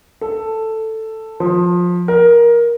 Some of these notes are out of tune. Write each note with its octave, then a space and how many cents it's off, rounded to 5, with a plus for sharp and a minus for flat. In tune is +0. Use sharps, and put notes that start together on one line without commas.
A4 +5
F3 +20
A#4 +15